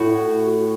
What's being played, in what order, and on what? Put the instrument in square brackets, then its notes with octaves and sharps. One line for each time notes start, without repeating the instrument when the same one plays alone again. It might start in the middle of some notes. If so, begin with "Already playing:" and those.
Already playing: [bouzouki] A2 F#4